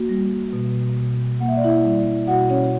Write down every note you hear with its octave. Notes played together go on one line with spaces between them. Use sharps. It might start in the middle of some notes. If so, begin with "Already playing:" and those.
Already playing: A#3 F#4
G3
B2
B2
A#3 F#5
E5
D5
E4 E5
G3
B2 F#4 F#5
C#4 C#5